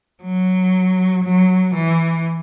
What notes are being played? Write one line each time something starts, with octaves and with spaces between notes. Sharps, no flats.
F#3
F#3
E3